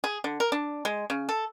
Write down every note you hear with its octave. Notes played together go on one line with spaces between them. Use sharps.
G#4
D3
A#4
D4
G#3
C#3
A4